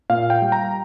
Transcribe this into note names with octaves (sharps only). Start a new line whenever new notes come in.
A#2 F5
G5
G3
A#5